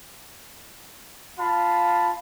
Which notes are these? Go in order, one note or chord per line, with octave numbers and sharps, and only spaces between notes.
F4 F5 A5 B5